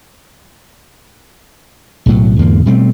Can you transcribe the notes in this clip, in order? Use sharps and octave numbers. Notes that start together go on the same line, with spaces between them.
B1 A2 F#3
E2 G#2 D3 A#3
B2 G3 A3 C4